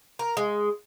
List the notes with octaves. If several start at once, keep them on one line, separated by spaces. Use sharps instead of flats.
A#4
G#3